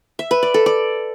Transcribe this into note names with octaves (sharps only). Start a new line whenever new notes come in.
E5
B4
D5
A4
D5